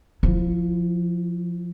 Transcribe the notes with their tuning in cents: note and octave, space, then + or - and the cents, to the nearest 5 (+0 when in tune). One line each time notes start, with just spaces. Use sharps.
F3 +0 E4 +30